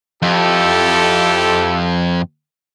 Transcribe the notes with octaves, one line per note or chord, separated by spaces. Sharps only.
F2 E4 G4 A4